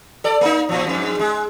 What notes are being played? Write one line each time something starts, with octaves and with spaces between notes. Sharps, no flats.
A4 D5
A#3 D#4
A#2 F3
F2 G#2
G#3